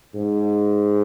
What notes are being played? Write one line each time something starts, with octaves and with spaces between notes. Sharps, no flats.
G#2